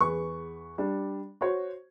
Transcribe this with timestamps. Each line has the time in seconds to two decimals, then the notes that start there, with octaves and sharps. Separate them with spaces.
0.01 E2 G#4 B4 C#6
0.78 G3 D4
1.41 F#4 C5 C#5